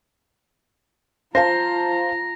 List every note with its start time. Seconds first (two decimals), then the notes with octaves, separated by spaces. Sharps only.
1.35 F4 C5 F5 A5 A#5 A#6